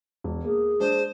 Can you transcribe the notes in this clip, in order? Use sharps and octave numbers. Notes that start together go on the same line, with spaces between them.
E1
A#3 G#4
G#3 D4 C5